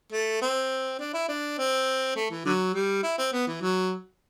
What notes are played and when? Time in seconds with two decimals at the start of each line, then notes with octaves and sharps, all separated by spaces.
0.12 A3
0.42 C4
1.00 D4
1.14 E4
1.28 D4
1.58 C4
2.16 A3
2.31 E3
2.45 D3 F#3
2.74 G3
3.03 E4
3.18 C4
3.32 B3
3.47 E3
3.62 F#3